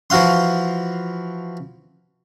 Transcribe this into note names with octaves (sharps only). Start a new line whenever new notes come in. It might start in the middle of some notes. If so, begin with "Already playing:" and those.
E3 F3 F#4 F5 C6